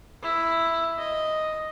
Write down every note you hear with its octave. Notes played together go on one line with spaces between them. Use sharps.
E4
D#5